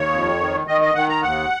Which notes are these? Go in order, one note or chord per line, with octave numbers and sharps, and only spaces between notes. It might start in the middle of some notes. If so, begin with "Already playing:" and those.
Already playing: D#2 C#5
F2
D#3
D#3 D#5
D#5
D#3 F#5
A#5
D#2 F#5